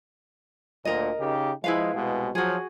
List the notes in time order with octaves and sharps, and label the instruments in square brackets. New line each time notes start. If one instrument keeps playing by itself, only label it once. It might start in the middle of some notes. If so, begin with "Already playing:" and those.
[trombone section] D2 A#2 [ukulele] A#4 D#5
[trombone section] C#3 D#4 G4
[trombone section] F3 G#3 [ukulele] E4 B4 F5
[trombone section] C2 B2 G#3
[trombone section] F3 F#3 [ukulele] F#4 G#4